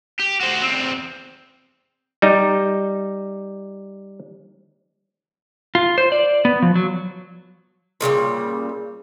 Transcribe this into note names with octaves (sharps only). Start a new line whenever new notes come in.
G4
F#4 C5
E2 C4
G3 D#4
F4
C5
D5
B3
F3
F#3
A#2 C#3 F3 G3